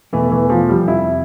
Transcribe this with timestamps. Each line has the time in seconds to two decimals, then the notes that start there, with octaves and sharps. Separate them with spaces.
0.13 E2 B2 E3 A3
0.32 E3
0.50 F3
0.69 G3
0.88 F2 C3 F3 E4